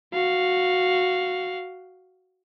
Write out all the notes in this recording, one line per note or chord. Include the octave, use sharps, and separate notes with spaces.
F#4 F5